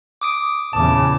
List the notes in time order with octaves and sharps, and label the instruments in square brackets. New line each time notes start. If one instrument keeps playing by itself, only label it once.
[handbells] D6 D#6 D7
[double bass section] E2 A#2 C#3 [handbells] A5 D6